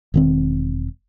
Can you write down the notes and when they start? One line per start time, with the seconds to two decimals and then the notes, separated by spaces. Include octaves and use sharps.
0.14 E1 D#3 C4